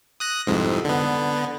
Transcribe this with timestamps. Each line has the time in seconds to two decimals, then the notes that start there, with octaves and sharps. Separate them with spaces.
0.20 D#6 F#6 A#6
0.47 C2 F2 G#2
0.85 D3 B3